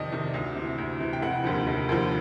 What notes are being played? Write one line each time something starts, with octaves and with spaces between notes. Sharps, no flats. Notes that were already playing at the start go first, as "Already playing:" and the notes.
Already playing: F2 C3 D#3 D5 D#5
C3 D#3
D2
C3 E3
D2
C3 E3
G5
F1 F#5
D#2 D3 F3
F1
D#2 D3 F3